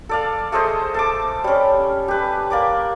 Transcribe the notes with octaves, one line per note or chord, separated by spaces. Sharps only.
A4 D5 F5
A3 G#4 C5 D#5
A4 A5 D6
G3 C#4
G4 B4
A#3 D5 D6